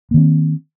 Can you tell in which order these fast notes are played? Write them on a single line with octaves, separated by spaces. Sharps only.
A#3 D#3 C4